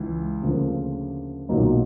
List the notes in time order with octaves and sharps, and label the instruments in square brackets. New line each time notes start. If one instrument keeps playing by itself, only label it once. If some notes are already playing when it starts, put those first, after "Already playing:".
Already playing: [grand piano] C#2 E3
D2 C#3 F3 A#3
B1 A#2 F#3 A#3 D#4